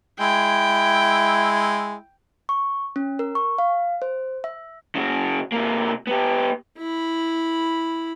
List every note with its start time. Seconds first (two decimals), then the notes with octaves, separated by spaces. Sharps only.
0.20 G#3 E4 G5
2.49 C#6
2.96 C#4
3.19 A#4
3.35 C#6
3.58 F5
4.02 C5
4.44 E5
4.95 C#3 F#4
5.52 C3 A#3
6.07 B3 G4
6.78 E4 B5